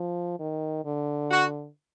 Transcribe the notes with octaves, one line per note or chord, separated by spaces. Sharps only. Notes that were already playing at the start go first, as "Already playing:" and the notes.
Already playing: F3
D#3
D3
F#4